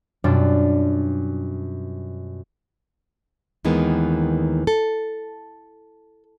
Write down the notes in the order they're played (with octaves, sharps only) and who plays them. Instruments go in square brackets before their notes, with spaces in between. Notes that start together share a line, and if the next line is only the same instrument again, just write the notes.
[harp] F#2 B2 F#3 G3 D4 F4
[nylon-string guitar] D#2 D#3 E3 G#3 B3
A4